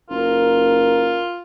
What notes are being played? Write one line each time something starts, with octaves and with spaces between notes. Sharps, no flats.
F#1 F4 A#4